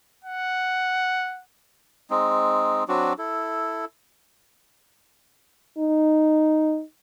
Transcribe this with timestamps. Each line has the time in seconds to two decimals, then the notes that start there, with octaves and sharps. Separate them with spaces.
0.24 F#5
2.10 G#3 C4 D#4
2.88 F#3 C4 D4 F#4
3.18 E4 A4
5.78 D#4